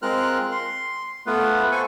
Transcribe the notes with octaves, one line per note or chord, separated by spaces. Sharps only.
G#3 C4 F4 A#4 F6 F#6
C6
A3 B3 F4 B4
A4 C5 G#5 C#6